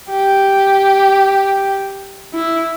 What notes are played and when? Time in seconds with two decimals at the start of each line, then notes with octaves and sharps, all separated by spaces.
0.12 G4
2.34 E4